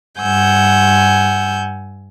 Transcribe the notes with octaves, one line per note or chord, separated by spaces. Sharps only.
G2 F#5 G#5 E6 G6